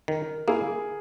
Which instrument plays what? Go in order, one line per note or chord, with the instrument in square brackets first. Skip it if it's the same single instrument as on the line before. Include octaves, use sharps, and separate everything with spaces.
[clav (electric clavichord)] D#3 [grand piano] A#4
[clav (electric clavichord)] A#3 E4 [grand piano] G#4